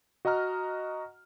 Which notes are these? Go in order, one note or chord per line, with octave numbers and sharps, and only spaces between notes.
F#4 D#5 F#5 A#5 F6